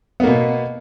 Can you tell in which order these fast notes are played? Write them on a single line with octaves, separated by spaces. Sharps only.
B3 A#3 B2